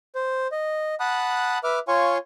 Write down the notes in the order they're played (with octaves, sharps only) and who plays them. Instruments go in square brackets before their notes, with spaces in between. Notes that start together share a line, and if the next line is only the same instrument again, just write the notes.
[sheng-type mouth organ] C5
D#5
F#5 A5 B5 D#6 F#6
B4 E5 D6 F6
F4 C#5 F5 G#5 C6 C#6